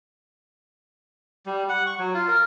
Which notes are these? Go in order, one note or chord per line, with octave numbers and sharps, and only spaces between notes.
G3
F#5
C#6
F#3
F4
A#4